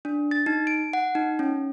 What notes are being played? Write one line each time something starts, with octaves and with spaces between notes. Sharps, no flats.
D4
A6
D#4
D7
F#5
D#4
C#4